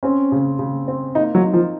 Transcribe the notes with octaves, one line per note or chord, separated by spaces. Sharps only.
C4 C#4
C#3
C#3
C4
A#3 D#4
F#3
D#4
F3